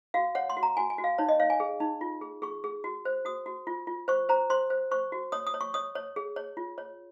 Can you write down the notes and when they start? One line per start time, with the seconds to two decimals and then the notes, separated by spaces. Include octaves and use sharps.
0.14 F#4 F5
0.35 C#5 F#5
0.50 C6
0.57 F#4
0.63 A#5
0.77 F#4 G#5
0.90 G#5
0.98 F#4
1.04 F5
1.18 D#4 C#5
1.29 D#5
1.40 C#5 F5
1.50 G#5
1.60 G#4
1.80 D#4
2.01 F4
2.21 G#4
2.42 G#4 C#6
2.64 G#4
2.84 F#4
3.05 C5
3.25 F#4 D#6
3.46 F#4
3.67 F4
3.87 F4
4.08 C5 C#6
4.29 C5 A#5
4.50 C5 C6
4.70 C5
4.91 C5 C#6
5.12 F#4
5.32 C#5 D#6
5.47 D#6
5.54 C#5
5.61 C#6
5.74 C#5 D#6
5.95 C#5
6.16 G#4
6.36 C#5
6.57 F4
6.78 C#5